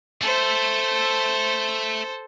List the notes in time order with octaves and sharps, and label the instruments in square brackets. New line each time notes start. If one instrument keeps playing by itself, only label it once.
[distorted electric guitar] A3 [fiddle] A4 C5